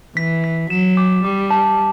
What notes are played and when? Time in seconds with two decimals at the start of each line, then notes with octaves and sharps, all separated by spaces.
0.16 E3 B6
0.44 B6
0.70 F#3 E7
0.97 D6
1.24 G3 D6
1.51 A5